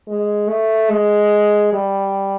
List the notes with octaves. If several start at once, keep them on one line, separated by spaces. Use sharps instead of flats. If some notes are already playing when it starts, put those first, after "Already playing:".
G#3
A3
G#3
G3